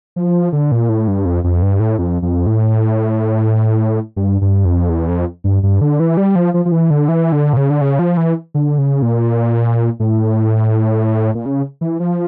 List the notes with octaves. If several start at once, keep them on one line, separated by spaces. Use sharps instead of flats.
F3
D3
A#2
A2
G2
F2
F2
G2
A2
F2
F2
A2
G2
G2
F2
E2
F2
G2
G2
D3
E3
G3
F3
F3
F3
E3
D3
E3
D3
A#2
C#3
D3
C#3
F3
E3
D3
C#3
A#2
A2
A#2
C#3
E3
F3